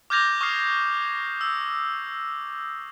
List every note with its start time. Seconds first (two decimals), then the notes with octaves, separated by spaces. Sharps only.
0.10 D6 F6 G6 G#6 A#6 F7
0.41 C#6 D#6 F6 C7
1.41 E6